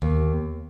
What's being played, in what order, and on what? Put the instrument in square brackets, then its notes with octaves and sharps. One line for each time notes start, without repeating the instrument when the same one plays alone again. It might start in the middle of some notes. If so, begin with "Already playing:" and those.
[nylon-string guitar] D#2